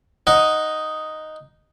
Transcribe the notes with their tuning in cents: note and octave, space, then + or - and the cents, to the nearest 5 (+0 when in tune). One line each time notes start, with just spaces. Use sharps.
D#4 +0 F#5 -5